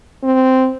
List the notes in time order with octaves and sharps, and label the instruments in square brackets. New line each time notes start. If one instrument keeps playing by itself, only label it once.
[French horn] C4